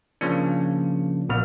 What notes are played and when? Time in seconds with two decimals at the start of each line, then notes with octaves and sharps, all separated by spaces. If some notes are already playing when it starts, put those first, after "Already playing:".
0.21 C#3 F3 A#3 D4
1.29 A#1 B2 A#3 F6